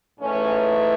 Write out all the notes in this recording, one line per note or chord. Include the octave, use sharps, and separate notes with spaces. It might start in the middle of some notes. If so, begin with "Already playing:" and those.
G#2 E3 A3 C#4